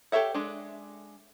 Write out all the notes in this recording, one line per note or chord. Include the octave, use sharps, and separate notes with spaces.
G4 A4 C#5 E5 F#5
G#3 D4